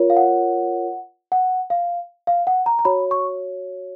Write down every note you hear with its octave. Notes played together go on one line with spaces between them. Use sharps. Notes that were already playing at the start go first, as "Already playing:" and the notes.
Already playing: F4 A#4 C#5
F5
F#5
F#5
F5
F5
F#5
A#5
A#5
F#4 C#5 B5
C#6